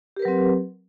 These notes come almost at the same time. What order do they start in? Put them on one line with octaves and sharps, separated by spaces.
G4 A#4 B4 F#3 C4